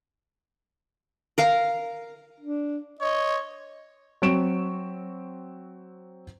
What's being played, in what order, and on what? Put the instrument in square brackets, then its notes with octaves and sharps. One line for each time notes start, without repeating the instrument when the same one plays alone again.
[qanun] A#4 F5 A#5
[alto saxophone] D4
[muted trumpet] C#5 [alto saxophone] D#5
[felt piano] F#3 C4 C#6 D7 E7